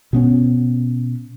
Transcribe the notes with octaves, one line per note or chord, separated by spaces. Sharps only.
B2 B3 C#4